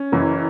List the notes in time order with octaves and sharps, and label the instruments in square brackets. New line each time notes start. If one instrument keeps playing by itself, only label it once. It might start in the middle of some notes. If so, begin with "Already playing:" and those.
Already playing: [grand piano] C#4
[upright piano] F#1 F#2 E3